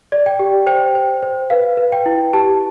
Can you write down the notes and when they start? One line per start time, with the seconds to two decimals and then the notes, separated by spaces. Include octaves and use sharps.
0.12 D5
0.26 G5
0.39 G4
0.67 C5 G5
0.95 C5
1.22 C5
1.50 B4 F5
1.77 B4
1.92 G5
2.06 E4
2.33 G4 A5